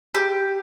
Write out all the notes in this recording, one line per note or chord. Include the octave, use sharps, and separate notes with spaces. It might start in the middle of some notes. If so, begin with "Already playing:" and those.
G4